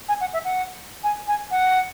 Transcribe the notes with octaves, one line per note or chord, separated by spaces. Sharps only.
G#5
F#5
E5
F#5
G#5
G#5
F#5